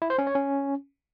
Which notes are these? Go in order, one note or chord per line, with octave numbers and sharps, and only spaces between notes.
E4
C5
C#4
C#5
C#4